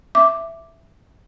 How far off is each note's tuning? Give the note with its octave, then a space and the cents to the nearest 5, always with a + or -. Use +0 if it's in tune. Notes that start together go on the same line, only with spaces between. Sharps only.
E5 +5 D6 +0